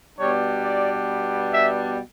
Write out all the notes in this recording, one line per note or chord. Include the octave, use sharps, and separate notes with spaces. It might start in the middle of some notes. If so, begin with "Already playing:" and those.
B2 G3 B3 D4 C#5
D5
E5